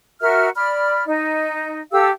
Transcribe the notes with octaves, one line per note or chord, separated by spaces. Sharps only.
F#4 A#4 E5 F6
D5 B5 F6
D#4
G4 A4 F5 E6